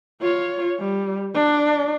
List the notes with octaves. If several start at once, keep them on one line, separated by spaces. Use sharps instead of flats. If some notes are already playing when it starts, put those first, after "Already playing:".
F4 C#5
G3
D4